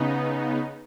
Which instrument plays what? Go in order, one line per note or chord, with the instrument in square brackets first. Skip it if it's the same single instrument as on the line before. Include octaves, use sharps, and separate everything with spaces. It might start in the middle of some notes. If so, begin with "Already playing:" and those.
Already playing: [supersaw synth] C#3 B3 D#4